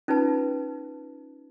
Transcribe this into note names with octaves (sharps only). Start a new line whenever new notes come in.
C#4 D#4 F4 B4 A5